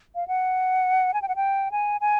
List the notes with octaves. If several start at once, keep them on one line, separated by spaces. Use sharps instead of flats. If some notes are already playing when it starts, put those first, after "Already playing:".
F5
F#5
G#5
G5
F#5
G5
G#5
G#5